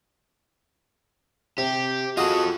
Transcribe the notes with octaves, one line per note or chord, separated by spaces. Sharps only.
C3 G4
F4 F#4 G#4 A4 D#5